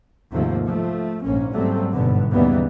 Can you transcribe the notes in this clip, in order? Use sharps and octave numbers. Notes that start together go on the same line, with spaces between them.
D#2 G#2 C3 F3 A3 A#3
F3 A3
A#1 G#2 A#3 C#4
G#2 F#3 G3 A3 A#3 C4
G1 G#2 B2 D3 B3
D#2 C#3 E3 G3 A#3 B3